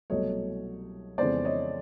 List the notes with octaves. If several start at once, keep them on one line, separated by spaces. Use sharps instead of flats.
C2 B2 F#3 A3 C#5 D#5
F2 C#3 E3 G#3 B3 C5 D5
C#5 D#5